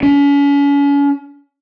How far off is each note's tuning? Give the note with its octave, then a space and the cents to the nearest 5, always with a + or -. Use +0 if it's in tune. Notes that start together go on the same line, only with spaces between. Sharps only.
C#4 +40